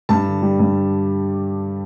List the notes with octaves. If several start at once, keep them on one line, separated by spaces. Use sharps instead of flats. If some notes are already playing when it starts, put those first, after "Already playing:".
G2 A5
D3
G3
G2